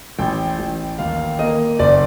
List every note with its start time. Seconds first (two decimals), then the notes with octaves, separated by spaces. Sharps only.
0.19 A1 G5
0.59 A1
0.99 D#2 F5
1.39 A#3 D#5
1.79 F#1 D5